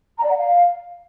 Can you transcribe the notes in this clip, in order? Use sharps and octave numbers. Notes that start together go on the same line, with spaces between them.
A#5
D5
F#5
F5